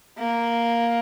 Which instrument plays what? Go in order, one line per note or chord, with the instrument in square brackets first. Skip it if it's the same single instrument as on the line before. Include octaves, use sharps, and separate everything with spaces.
[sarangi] A#3